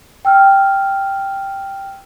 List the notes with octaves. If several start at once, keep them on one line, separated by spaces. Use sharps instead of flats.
G5 E6 F6